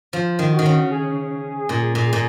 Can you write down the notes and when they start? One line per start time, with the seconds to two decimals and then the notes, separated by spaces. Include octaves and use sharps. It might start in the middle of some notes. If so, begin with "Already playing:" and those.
0.13 F3 F4
0.39 D#3
0.52 F#4
0.59 D#3
0.66 C#3
0.91 G#4
1.69 A#2
1.95 A#2
2.13 A#2